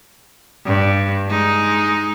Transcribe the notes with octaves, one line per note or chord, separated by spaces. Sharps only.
G2
G#3 D#4